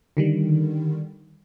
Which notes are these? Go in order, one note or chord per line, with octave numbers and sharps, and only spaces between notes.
D3 D#3 G3